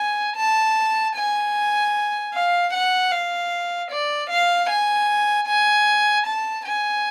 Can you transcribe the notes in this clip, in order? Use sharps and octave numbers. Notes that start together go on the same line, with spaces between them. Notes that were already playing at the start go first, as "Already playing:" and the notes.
Already playing: G#5
A5
G#5
F5
F#5
F5
D5
F5
G#5
G#5
A5
G#5